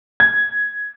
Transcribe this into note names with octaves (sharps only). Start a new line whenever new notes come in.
G#6